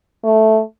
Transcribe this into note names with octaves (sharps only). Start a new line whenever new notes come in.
A3